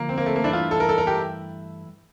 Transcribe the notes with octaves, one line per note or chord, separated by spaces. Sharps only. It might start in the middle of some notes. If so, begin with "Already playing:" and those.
Already playing: D3 F3 A#3
C4
A#3
A3
A#3
G2 E3 A3 D4 E4
F4
A4
A#4
A4
A#4
G4